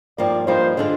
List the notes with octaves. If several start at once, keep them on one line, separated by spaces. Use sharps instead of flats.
G2 F3 A#3 D5
G2 F3 A#3 D#4 C5
D3 G#3 D4 F4